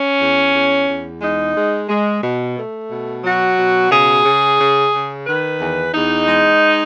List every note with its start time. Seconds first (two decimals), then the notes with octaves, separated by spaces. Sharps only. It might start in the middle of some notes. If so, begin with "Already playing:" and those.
Already playing: C#4
0.20 E2
0.54 E2
0.88 E2
1.22 G#3 D#4
1.56 G#3
1.88 G#3
2.23 B2
2.57 A3
2.90 B2
3.24 F#3 F#4
3.58 B2
3.91 C#3 G#4
4.25 C#3
4.59 C#3
4.93 C#3
5.27 D#3 B4
5.61 E2
5.94 E2 D#4
6.27 G#3